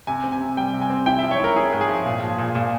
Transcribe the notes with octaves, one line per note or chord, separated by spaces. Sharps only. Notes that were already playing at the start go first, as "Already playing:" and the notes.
C3 G#5
C4
G#5
C3
G3 G5
C3
G#5
C4
E4 G5
F3 E5
C#5
E4 A#4
E4 G#4
G#2
G#4
F3
A#2
F3
A#2
A#2